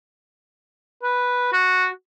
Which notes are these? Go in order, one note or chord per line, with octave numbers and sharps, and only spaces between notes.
B4
F#4